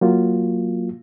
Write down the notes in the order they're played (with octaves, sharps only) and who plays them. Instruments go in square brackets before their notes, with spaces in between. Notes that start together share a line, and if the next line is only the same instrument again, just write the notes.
[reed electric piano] F#3 A#3 F4